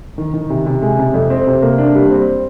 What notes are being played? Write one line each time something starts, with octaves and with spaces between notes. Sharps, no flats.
D#3
D#3
C3
C3
G#3
C3
F2
C4
C3
A#3
D4
G3
C4